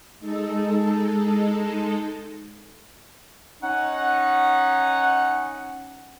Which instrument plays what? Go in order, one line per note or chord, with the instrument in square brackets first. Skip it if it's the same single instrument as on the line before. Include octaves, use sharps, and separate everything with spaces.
[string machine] G#3 D#4 A4
[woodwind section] C#4 D#4 F#5